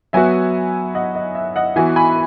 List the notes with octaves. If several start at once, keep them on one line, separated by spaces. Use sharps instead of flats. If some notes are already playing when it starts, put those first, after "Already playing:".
F#3 B3 F#4 E5 G#5
D#5 F#5
D#5
E5
D#5 F#5
E3 B3 F#4 E5 G#5
G#5 B5